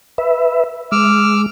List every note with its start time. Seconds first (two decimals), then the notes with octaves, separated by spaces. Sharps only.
0.18 B4 E5
0.92 G#3 D6 E6 F6